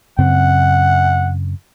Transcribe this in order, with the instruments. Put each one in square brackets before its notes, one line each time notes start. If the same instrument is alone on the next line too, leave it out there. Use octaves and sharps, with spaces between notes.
[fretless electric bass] F#2 C#3 C4 [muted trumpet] F#5